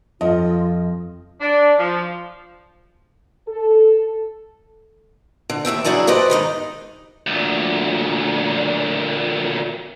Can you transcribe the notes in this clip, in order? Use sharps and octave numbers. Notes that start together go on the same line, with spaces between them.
F2 F4 D#5
D4
F3
A4
D3
D#2 D#3 E5 G5
C#3 F#3 D4 E4 G#4
G4 B4 C5 D5 D#5
G#2 D#3 D#4
D2 A#2